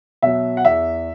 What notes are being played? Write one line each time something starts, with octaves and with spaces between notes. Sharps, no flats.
B2 F#3 E5
F#5
E2 E5